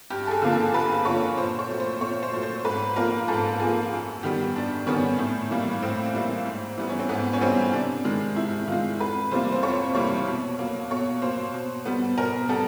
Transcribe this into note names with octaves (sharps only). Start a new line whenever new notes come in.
G2 G4
A4
G#4
D3 F3 A#3
A4
G2 B4
D3 F3 A#3 C#5
A#2 C5
C#5
F#3 A3
C5
A#2 C#5
C5
F#3 A3
C5
G#2 B4
F3 A#3 A#4
G#2 A4
F3 A#3 G#4
F#2
D#3 G3 B3 G4
F#2 D4
D#3 G3 B3 C#4
A2
E3 G3 A#3
A2 C4
E3 G3 A#3
G#2
E3 G3 B3
C#4
C4
G#2 B3
C#4
E3 G3 B3 C4
C3 D4
D#3 G#3
C3 E4
D#3 G#3 F4
F2 B4
C3 E3 G3 A#3 C5
C5
F2 C#5
C3 E3 G3 A#3 C#5
B2
F#3 A#3
B2 C#5
F#3 A#3 C5
B2
G3 B3
B2 A#4
G3 B3 A4